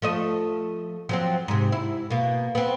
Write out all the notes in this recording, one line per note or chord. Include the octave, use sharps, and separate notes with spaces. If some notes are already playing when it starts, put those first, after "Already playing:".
F3 A3 D#5
F3 F#3 C4
G#2 C3
E4
B2 A#3
B3 C4